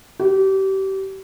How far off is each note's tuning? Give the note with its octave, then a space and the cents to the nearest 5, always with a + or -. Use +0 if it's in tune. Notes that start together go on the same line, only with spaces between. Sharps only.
G4 -30